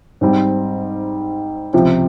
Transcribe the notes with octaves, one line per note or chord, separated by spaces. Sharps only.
G#2 G3 C4
C#2 C3 F3 C4